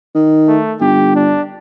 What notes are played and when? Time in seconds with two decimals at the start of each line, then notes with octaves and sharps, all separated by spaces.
0.15 D#3
0.48 A3
0.81 G1 G4
1.16 D4